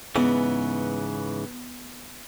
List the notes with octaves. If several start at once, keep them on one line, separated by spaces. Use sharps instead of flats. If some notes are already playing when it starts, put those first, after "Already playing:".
G#2 C#3 E3 B3